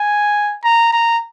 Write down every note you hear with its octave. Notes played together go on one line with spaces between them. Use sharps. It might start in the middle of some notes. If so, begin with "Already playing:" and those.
Already playing: G#5
A#5
A#5